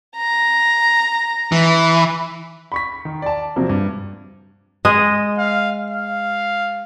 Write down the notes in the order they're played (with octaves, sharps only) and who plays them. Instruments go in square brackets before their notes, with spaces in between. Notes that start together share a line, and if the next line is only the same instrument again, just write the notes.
[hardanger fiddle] A#5
[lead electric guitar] E3
[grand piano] B5 C#6 B6
D#3
D5 A5
C3 F3 F#3 A#3
G2
[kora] G#3 D#5
[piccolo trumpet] F5
F5